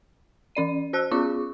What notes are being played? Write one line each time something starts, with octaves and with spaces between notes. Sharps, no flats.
E3 C#4 D5 D#7
F#4 C5 A5 E6 F#6
B3 C#4 F4 G#4 C#6 D6